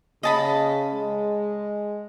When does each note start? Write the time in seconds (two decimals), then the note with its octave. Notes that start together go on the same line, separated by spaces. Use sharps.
0.23 C#3 D#5 A5 B5
0.94 G#3